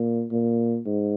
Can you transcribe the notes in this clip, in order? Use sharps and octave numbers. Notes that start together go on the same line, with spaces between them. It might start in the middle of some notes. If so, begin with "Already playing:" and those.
Already playing: A#2
A#2
G#2